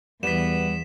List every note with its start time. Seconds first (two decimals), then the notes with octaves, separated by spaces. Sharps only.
0.23 E2 G3 B3 B6 E7